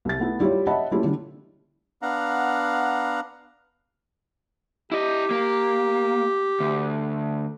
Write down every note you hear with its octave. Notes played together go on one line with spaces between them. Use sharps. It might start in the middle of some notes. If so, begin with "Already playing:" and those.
C2 A6
A3 B3 E4
G3 E4 F4 G4 C#5
C#5 D#5 E5 F#5 A5 B5
G3 A3 A#3 C#4 E4 F4
D3 E3 G3 D4
B3 D4 F5 F#5 A#5
E4 G4 D#5
A#3
D2